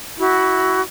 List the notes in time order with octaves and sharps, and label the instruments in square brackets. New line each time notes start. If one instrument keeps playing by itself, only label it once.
[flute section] E4 F#4